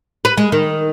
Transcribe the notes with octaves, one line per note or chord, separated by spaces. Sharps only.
B4
G#3
D#3